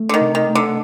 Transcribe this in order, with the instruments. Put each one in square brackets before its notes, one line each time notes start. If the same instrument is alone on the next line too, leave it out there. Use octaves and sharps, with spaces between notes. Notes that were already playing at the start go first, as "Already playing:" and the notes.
Already playing: [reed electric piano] A3
[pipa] D3
D#3
[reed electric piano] C3
[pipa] D#3
[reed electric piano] A3
[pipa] D3